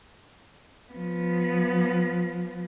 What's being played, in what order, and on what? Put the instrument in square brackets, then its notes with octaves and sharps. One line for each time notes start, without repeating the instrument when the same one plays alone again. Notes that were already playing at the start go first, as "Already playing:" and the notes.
[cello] F3 B3